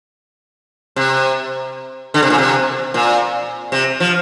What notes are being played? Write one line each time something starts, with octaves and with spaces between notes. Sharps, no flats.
C3
D3
C3
A#2
C3
A#2
C3
F3